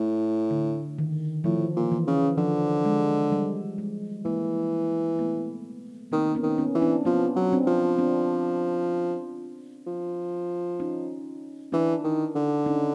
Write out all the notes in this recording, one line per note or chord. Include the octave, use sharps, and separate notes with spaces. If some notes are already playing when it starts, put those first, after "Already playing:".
Already playing: A2
D3
D#3
A2 F3
A#2
E3
C#3
D3 F3
G#3
G3
G#3
E3 G#3 A#3
A3 B3
D#3 A#3 C4
B3 C#4
D#3
B3 C#4
E3
C4 D4
F3 B3 C#4
F#3
C4 D4
F3
C4 D4
F3
C#4 D#4
E3 D4 E4
D#3
D3
C#4 D#4